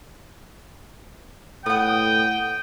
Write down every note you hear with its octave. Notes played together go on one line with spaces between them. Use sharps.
A2 B3 F#5 G5 D#6